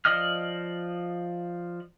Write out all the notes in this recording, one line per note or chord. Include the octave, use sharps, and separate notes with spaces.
F3 D5 D#5 D#6 F6